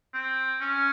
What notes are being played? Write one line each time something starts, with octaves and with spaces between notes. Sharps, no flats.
C4
C#4